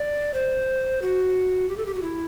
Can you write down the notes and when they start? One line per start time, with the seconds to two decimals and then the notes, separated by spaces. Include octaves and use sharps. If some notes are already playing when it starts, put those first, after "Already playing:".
Already playing: D5
0.34 C5
1.02 F#4
1.69 G4
1.77 A4
1.86 G4
1.94 F#4
2.02 E4